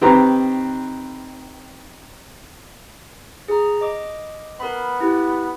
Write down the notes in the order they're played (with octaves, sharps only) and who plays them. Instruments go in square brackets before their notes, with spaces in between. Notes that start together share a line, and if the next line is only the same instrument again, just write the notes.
[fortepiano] D#3 C4 G4 B4 A#5
[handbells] G#4 A#5
D#5 D6
[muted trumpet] B3 [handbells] A#4 B5
[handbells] E4 G4